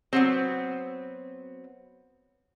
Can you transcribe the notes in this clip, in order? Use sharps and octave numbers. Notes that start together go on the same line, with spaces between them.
F#3 B3 C4